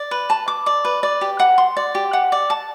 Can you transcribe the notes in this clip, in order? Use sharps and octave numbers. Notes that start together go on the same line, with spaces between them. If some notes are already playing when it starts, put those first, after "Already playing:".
Already playing: D5
B4
A5
D6
D5
B4
D5
G4
F#5
C6
D5
G4
F#5
D5
A5